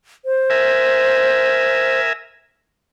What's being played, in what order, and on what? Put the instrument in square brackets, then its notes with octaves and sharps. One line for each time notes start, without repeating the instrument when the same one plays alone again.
[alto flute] C5
[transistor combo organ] A#4 E5 G#5